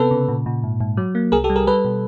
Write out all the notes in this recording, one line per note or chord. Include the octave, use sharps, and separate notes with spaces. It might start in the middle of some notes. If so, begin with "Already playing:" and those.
Already playing: C3 B3 A4 B4
C#3
A#2
A#2
G#2
G#2
F#3
A#3
C2 G#4 A#4
G4 A4
G3
G#4 A#4
G3 A4 B4
B2